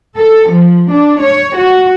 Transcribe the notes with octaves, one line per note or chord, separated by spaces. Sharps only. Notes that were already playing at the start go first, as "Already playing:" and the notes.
A4
F3
D4
C#5
F#4